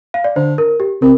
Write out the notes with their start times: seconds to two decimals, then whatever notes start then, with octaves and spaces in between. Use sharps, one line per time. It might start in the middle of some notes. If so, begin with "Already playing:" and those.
0.14 F5
0.24 D5
0.36 D3 C5
0.58 A#4
0.80 G4
1.02 C3 A#4